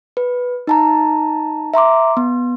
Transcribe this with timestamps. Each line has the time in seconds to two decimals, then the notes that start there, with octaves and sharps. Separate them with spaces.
0.17 B4
0.67 D#4 A5 A#5
1.74 E5 A#5 C6 D6
2.17 B3